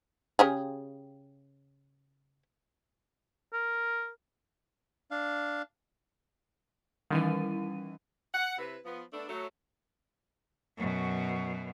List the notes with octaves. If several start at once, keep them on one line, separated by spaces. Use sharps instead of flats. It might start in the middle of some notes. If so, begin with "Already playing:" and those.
C#3 G4 G#4
A#4
D4 F5
D#3 E3 G3 C#4 D#7
F#5
C3 E4 B4
F3 B3
A3 B3 D4
F#3 A3
F#2 B2